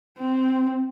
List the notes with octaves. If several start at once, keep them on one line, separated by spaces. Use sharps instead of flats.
C4